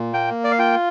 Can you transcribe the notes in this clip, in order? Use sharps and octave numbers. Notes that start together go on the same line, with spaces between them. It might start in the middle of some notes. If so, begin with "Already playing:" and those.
Already playing: A#2
A#3 G5
D5
F5
F4 G5